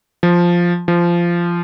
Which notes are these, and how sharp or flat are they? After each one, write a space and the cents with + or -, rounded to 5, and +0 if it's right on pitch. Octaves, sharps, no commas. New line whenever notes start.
F3 +0
F3 -15